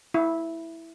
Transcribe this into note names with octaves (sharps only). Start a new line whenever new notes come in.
E4